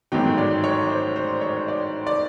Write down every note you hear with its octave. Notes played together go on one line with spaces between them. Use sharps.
A1 G#2 D#3 F#3 G5
D5
C#5
C5
C5
C#5
D5
D5